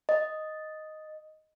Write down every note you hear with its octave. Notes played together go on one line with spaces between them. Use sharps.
D#5